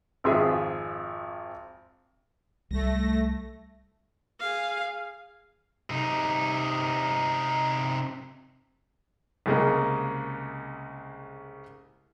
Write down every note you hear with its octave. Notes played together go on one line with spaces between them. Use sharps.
G#1 F2 F4 G#4 E5
C2 G3 A3 A#6
G#4 F5
C3 D#4
C2 C#3 G#3 A#3